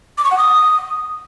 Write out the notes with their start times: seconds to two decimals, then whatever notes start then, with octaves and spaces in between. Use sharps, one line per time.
0.18 D6
0.24 C#6
0.31 F#5
0.38 D#6